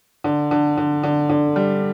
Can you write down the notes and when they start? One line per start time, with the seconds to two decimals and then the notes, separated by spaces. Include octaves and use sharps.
0.24 D3
0.51 D3
0.78 D3
1.03 D3
1.30 D3
1.56 G3